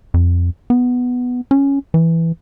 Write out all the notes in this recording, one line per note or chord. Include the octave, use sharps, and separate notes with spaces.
F2
B3
C#4
E3